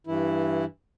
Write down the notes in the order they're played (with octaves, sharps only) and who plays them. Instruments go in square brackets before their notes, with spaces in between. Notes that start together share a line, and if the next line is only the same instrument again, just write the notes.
[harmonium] G2 E3 E4